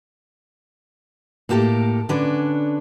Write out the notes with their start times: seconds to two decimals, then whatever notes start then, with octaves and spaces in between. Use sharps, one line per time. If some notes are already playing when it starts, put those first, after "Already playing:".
1.49 A2 A#3 G4 A4 A#4
2.09 D3 C#4 D4 A4 B4